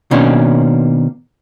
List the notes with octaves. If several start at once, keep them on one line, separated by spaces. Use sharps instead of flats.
B2 D#3 A#3 C#4 D4